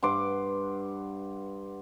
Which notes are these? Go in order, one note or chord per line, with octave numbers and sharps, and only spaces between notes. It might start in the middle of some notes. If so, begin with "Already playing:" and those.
G2 F#5 C6 D6